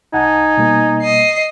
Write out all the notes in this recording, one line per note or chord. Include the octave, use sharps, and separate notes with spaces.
C2 D#4 F#5 G#5 A5
B2 G3 A#3
D#5 C7